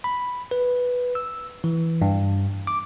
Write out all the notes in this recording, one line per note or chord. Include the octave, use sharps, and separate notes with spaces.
B5
B4
E6
E3
G2
D6